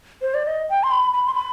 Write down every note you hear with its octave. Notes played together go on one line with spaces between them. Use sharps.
C5
D5
D#5
G5
C6
B5
B5
C6
B5